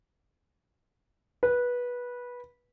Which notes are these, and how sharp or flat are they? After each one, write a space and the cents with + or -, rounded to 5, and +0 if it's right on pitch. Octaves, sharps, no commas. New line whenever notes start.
B4 -15